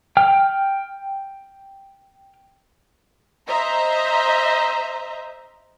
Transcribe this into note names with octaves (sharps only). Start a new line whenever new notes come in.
G5 F6
C5 D#5 E5 A#5